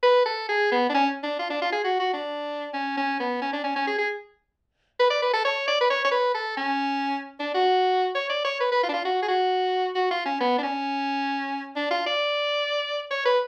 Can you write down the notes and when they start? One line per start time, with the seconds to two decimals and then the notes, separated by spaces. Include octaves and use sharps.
0.03 B4
0.26 A4
0.49 G#4
0.72 B3
0.89 D4
0.94 C#4
1.24 D4
1.39 F4
1.50 D4
1.62 F4
1.72 G#4
1.84 F#4
2.00 F#4
2.13 D4
2.74 C#4
2.97 C#4
3.20 B3
3.42 C#4
3.53 D4
3.64 C#4
3.76 C#4
3.87 G#4
3.98 G#4
5.00 B4
5.10 D5
5.22 B4
5.34 A4
5.45 C#5
5.68 D5
5.81 B4
5.90 C#5
6.05 C#5
6.12 B4
6.34 A4
6.57 C#4
7.40 D4
7.54 F#4
8.15 C#5
8.29 D5
8.45 C#5
8.60 B4
8.72 B4
8.83 F4
8.89 D4
8.94 F4
9.05 F#4
9.22 G#4
9.28 F#4
9.95 F#4
10.11 F4
10.26 C#4
10.41 B3
10.58 D4
10.63 C#4
11.76 D4
11.91 F4
12.06 D5
13.11 C#5
13.25 B4